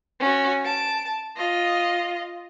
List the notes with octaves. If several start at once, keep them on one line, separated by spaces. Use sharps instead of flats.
C#4 F#4
A5 D7
F4 D#5